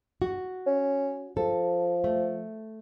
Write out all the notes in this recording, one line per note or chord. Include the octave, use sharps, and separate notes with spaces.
F#4
C#4
F3 A4
A3